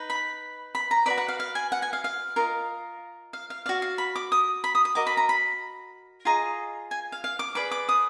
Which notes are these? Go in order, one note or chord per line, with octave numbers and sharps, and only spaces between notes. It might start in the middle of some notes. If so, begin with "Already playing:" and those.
Already playing: D#4 B4
B5
B5
A#5
F#4 B4 D5 B5
F#5
F5
F5
G#5
F#5
G#5
F5
F5
F4 A#4 D#5
F5
F5
F#4 D5 F5
F5
B5
D6
D#6
B5
D#6
D#6
F#4 A#4 D#5 D6
B5
A#5
B5
F4 G#4 D#5 A#5
G#5
F5
F5
D6
G#4 B4 D5 D6
D6
D#6